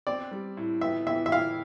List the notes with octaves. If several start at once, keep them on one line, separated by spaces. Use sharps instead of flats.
C4 D5
G3
A2
B3 E5
E3 E5
E5
E4 F5